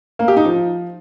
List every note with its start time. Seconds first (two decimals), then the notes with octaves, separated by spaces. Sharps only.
0.19 A#3
0.28 G4
0.37 D#4
0.45 F3